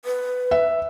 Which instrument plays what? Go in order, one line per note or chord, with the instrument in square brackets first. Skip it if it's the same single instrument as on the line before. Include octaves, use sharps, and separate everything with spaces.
[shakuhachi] B4
[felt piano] E5